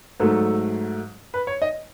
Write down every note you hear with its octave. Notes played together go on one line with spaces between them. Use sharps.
G#2 F#3 A3 A4
B4
C#5
D#5